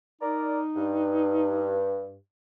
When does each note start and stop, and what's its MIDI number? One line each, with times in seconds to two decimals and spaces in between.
0.21 1.81 63
0.21 0.60 70
0.21 0.60 74
0.21 0.60 82
0.75 2.15 43